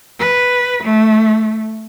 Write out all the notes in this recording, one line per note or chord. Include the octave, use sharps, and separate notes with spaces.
B4
A3